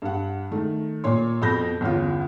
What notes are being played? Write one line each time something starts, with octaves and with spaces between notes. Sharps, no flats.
G2 F#5
D#3 A3
A#2 C#5 C6
F2 B2 B5 G6 A#6
G1 E2 C#4 F4